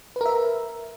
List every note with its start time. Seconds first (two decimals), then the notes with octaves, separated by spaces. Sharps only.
0.16 B4
0.21 A#4
0.26 E5